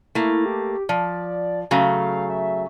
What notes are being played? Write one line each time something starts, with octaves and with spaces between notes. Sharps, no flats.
A3 A#3 E4
G4
F3 D5
C#3 F#3 A3 F5
E5